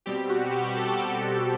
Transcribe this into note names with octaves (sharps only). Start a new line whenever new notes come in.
B2 G3 C4 G4
F#4
G4
A4
G4
F#4